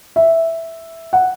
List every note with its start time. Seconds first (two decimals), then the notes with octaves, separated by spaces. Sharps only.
0.16 E5
1.13 F#5